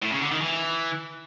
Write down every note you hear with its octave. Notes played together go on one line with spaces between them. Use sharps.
A2
C#3
D3
D#3
E3